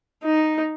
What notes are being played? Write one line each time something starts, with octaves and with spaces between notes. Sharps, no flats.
D#4